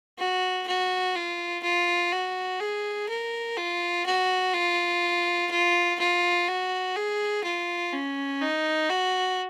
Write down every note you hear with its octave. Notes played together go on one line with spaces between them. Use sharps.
F#4
F#4
F4
F4
F#4
G#4
A#4
F4
F#4
F4
F4
F4
F#4
G#4
F4
C#4
D#4
F#4